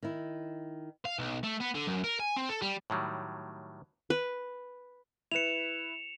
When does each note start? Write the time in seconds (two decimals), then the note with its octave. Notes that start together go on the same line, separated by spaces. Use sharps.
0.03 D#3 E4
1.05 F5
1.19 B1
1.43 A3
1.60 B3
1.75 D3
1.87 F#2
2.04 A#4
2.20 G#5
2.36 C4
2.49 A4
2.62 G3
2.90 A2 D#3 F#3 G3
4.10 B4
5.31 E4 B4 C#7 E7 F7